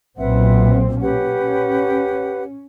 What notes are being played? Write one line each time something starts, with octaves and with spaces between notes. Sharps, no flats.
B1 A#2 C4 B4 E5 F#5
C#4 G4 B4 F#5